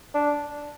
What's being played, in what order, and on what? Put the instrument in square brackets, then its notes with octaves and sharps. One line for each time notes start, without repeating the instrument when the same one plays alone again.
[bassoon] D4